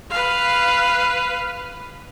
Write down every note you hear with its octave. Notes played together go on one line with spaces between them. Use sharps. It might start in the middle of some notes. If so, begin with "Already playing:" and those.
B4 F5